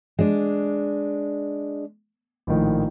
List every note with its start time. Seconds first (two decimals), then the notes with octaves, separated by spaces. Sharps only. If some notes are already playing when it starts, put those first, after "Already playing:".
0.19 G#3 D4
2.47 A#1 A2 D#3